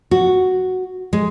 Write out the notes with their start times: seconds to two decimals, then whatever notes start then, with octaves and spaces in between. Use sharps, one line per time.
0.11 F#4
1.13 G#3